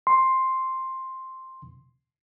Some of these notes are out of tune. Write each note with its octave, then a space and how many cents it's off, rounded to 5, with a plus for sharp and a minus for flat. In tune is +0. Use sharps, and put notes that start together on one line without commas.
C6 +5